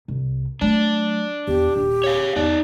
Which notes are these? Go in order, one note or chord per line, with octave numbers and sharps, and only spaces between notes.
C2
F#3 A3 D4
E2 G4
D#1
C#5 F5
E2 D#4 D5